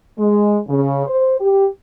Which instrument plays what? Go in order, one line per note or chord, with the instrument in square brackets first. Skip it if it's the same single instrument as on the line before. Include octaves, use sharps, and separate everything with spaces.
[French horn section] G#3
C#3
C5
G4